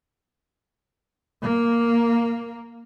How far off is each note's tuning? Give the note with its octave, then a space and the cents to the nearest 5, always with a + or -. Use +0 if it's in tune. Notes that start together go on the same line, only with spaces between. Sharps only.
A#3 +0